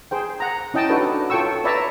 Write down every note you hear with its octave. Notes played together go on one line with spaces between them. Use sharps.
G#4 C5 G5
F#5 A#5
C#4 E4 D#5 G5 A5
D4 D#4 F#4 A4 B4 C#5
F4 A4 C#5 G5 C#6 E6
B4 C#5 D5 E5 A5 A#5